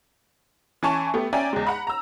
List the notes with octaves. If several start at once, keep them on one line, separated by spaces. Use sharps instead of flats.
E3 C#4 G#5 A5 C#6
A3 B3 G4
C#4 D5 E5 G5 G#5 A#5
E2 G#3
F#5 A#5 B5
A#5 E6